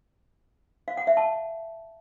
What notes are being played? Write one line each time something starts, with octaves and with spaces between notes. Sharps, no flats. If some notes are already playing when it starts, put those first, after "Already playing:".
F5
F#5
E5
A5